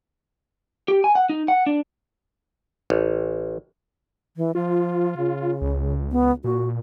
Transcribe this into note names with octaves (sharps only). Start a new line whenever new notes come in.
G4
G#5
F#5
D#4
F#5
D4
A1
E3
F3 F4
C#3
C#2
B3
A#2 F#4